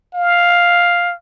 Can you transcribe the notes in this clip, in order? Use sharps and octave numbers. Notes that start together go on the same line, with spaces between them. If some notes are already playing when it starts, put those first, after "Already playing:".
F5